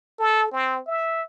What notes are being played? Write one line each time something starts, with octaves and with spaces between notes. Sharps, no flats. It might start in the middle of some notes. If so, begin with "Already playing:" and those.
A4
C4
E5